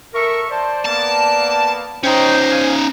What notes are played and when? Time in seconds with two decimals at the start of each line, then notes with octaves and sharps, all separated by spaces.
0.14 A4 A#4 E5 C#6
0.50 C5 D5 A5
0.85 A#3 B3 A5
2.03 C#4 D#4 C5 C#5 D#5 G5
2.50 F5 G#5